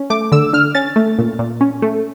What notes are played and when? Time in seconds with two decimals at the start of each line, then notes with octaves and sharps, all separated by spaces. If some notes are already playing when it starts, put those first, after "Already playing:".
Already playing: C#4
0.10 A3 D6
0.32 D3 E6
0.53 D3 F6
0.75 C#4 A6
0.96 A3
1.19 A#2
1.39 A#2
1.61 C#4
1.82 A3